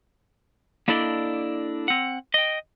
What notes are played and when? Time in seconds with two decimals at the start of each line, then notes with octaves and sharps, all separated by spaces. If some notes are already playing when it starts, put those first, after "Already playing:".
0.88 A#3 D4 E4 A4 D5 D#5
1.88 C4 F#5
2.34 D#5 G5